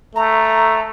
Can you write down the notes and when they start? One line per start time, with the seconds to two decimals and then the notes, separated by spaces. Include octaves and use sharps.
0.15 A3 A#5